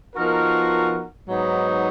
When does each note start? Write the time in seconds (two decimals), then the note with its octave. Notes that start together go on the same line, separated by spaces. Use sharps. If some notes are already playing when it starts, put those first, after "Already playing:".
0.14 F3 B3 D#4 F#4 A#4
1.28 G#2 F#3 B3 D#4